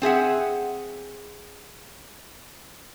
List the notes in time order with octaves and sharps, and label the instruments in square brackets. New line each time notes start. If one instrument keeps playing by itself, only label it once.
[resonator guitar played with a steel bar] C4 G#4 E5 F#5